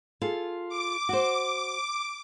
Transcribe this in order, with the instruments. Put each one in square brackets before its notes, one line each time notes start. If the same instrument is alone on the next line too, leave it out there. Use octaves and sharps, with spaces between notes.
[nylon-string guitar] F4 G#4 A4
[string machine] D6
[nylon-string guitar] F#4 C5